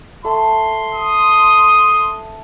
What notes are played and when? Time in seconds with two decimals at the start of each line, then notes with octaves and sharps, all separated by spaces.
0.25 A3 C6
0.94 D#6